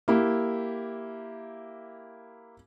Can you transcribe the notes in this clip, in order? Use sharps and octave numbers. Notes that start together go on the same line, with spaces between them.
A#3 E4 G4